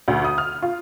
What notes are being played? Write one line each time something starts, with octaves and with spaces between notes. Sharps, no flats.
D2
D#6
F6
F4